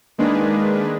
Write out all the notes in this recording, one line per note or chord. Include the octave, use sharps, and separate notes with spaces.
D#3 G#3 A#3 D4 G#4 B4